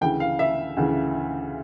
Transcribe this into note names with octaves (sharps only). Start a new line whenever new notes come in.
D2 C#3 E3 G5
F5
E5
D2 C#3 E3